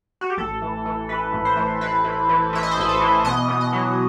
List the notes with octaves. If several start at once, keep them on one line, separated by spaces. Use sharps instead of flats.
F#4
G4
A1 A4
E3
E3
E3 B4
A1
C5
E3
E3 B4
E3
E3
E3 E5
D#5
C5
A1 B4
A4
E3
B2 D#5
B2
D#5
F#3